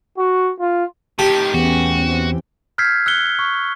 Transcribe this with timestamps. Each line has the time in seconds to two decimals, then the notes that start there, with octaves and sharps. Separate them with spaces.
0.18 F#4
0.60 F4
1.19 A2 D#3 G4 A5
1.54 E2 A3 B3 C#4 F#4
2.03 E3 C4
2.78 E6 F6 G6 G#6 B6 C7
3.06 E6 F#6 C#7 G7
3.39 C#6